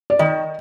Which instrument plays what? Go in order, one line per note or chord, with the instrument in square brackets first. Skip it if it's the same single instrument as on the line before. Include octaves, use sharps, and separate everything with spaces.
[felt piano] D5
[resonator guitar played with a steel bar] D#3 [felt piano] D#5